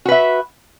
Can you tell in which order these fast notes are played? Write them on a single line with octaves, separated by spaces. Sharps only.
F#4 B4 E5